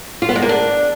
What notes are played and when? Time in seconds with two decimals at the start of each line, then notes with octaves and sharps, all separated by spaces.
0.22 F4
0.29 B3
0.35 G#3
0.42 A#3
0.49 D4